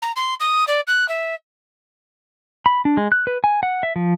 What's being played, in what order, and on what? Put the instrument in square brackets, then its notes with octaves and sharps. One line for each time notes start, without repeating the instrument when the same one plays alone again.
[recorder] A#5
C6
D#6
D5
F#6
E5
[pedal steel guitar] B5
D4
G#3
F#6
B4
G#5
F#5
E5
F3